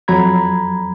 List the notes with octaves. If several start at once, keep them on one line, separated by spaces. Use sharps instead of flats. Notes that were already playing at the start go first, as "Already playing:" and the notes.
F2 F#3 A#5 B5 G#6